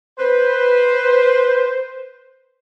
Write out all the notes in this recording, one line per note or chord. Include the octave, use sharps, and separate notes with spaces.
B4 C5